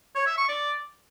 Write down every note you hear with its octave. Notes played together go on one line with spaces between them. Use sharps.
C#5
E5
C#6
D5